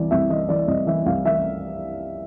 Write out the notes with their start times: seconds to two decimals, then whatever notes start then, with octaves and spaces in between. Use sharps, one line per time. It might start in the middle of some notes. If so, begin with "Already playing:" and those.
Already playing: C2 E3 D5
0.11 C2 E5
0.30 E3 D#5
0.49 E3 D5
0.68 C2 D#5
0.87 E3 E5
1.06 C2 F5
1.25 E3 E5